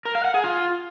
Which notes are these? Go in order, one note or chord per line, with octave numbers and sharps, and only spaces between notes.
A#4
F5
F#5
G#4
F4